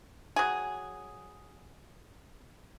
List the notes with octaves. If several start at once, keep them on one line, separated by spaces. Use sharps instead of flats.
F#3 G#4